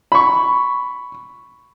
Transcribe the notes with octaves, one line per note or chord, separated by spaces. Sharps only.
B5 C#6